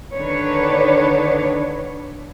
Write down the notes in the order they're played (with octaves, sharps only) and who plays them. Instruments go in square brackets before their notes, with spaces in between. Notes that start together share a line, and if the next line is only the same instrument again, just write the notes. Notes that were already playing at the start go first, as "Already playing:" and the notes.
[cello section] D3 D#3 D4 B4 C#5